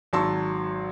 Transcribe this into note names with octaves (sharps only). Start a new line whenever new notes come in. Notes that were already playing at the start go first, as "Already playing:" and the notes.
G#1 F#3 A5 C6 C#6 E6